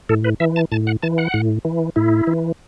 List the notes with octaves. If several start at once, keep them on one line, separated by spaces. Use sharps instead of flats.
A2 A4
B4
E3 E5
A5
A2 A5
F#5
E3 A5
F#5
A2
E3
A2 E4
E3